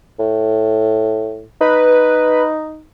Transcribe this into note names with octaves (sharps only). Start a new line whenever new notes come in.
A2
D#4 B4